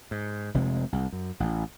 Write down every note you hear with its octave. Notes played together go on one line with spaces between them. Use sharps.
G#2
F1 C3 F3 G#3
C2
F#2
A1